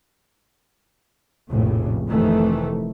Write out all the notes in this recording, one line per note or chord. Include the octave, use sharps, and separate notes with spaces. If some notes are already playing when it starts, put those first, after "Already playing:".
F1 A#1 A2 C#3
F1 F2 D#3 E3 A3